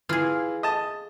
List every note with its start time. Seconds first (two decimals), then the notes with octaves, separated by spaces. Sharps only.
0.09 E3 F4 G#4
0.63 D#5 A5